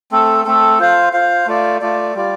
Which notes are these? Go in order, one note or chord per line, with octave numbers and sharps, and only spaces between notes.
A3 C4 A4
A3 C4 A4
F4 C5 F5
F4 C5 F5
A3 F4 D5
A3 F4 D5
G3 F4 D5